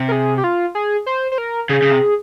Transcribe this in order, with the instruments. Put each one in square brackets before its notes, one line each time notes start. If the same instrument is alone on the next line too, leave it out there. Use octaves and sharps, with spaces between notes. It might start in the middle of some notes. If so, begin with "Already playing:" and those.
Already playing: [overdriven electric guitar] C3
[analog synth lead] A#4
G#4
G4
F4
G#4
C5
C5
A#4
[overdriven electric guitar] C#3 [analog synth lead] G#4
[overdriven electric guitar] C#3
C3